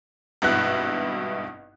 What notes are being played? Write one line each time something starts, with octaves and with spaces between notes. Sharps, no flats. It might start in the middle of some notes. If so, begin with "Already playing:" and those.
G#1 G2 B2 E4 F#6